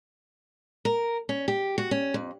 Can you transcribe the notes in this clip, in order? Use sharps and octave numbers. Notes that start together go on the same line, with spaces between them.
A#4
C#4
G4
F#4
C#4
F2